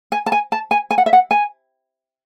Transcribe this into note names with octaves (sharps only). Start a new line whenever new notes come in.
G#5
A5
G#5
A5
G#5
G#5
F#5
E5
F#5
G#5